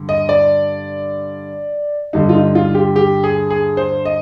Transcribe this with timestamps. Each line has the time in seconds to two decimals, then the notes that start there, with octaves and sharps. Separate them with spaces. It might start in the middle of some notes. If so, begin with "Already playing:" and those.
Already playing: G2 D3
0.09 D#5
0.29 D5
2.13 G2 D3 G3 D#4
2.29 F4
2.35 D#4
2.55 F4
2.75 G4
2.96 G4
3.24 G#4
3.50 G#4
3.77 C5
4.05 D#5